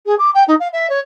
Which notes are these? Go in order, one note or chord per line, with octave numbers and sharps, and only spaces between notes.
G#4
D6
G5
D#4
F5
E5
C#5